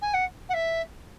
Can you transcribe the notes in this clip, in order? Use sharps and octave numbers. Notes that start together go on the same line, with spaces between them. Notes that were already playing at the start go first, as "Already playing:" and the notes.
G#5
F#5
F#5
E5